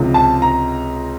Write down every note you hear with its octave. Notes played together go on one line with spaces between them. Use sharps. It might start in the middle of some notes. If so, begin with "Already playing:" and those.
Already playing: C#2 C3 F3
A5
A#5